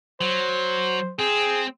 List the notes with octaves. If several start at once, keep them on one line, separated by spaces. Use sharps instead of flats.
F#3 C5
C4 G#4